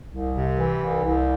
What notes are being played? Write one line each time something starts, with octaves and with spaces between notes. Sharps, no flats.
C2
C3
E3
C2
C2